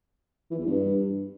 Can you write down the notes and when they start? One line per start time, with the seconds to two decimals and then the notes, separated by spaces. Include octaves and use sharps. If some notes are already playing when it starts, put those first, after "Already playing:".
0.51 E3
0.58 E2
0.66 G2